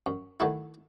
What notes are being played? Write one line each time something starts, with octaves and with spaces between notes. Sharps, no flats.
F#2
D#3 F#3 A3 E4